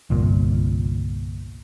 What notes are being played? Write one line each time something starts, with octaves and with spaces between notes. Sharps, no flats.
G1 C2 A#2